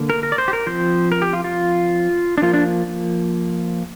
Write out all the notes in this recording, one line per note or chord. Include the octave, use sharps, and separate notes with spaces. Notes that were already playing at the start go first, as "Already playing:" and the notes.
Already playing: D3 A#3
A#4
A#4
D5
C5
G4
A#4
F3 C4 C5
A#4
G4
F4
F4
D4
F3 A#3 F4
D4